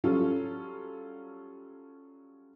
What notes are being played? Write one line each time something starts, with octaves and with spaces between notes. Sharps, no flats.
F#3 G3 C#4 F4 A4